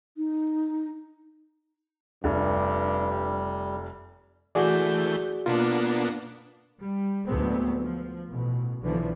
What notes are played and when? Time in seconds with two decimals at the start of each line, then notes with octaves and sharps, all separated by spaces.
0.17 D#4
2.24 F1 G2 G3
4.55 E3 A3 F#4 G#4 D5 G6
5.46 B2 A#3 B3 D4 F4
6.80 G3
7.26 D2 A2 F#3 G#3 B3 C4
7.79 F3
8.28 A1 B2
8.81 B1 D3 E3 F3